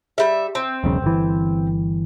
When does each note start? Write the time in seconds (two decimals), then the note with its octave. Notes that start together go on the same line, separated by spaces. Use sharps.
0.18 G3 E5
0.55 C4
0.84 E1 B1 C#3
1.02 G1 E3